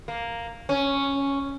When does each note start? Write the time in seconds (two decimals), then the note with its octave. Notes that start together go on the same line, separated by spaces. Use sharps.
0.08 A#3
0.69 C#4